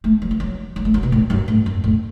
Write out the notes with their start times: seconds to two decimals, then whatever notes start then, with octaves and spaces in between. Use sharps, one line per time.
0.04 A3
0.22 F#3
0.31 E3
0.40 F#3
0.76 F#3
0.85 A3
0.94 F#3
1.03 B2
1.12 A2
1.30 F#2
1.48 A2
1.66 F#2
1.84 A2